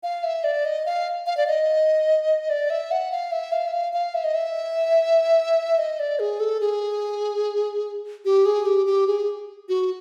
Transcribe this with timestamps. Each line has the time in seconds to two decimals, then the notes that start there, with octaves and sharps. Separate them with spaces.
0.03 F5
0.24 E5
0.44 D5
0.65 D#5
0.86 F5
1.26 F5
1.37 D5
1.47 D#5
2.50 D5
2.70 E5
2.91 F#5
3.12 F5
3.32 E5
3.52 F5
3.67 E5
3.73 F5
3.93 F5
4.14 E5
4.24 D#5
4.35 E5
5.79 D#5
5.99 D5
6.19 G#4
6.40 A4
6.61 G#4
8.25 G4
8.46 G#4
8.66 G4
8.86 G4
9.07 G#4
9.69 F#4